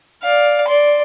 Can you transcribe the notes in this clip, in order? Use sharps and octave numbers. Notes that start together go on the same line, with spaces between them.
D5 F5
D5 C6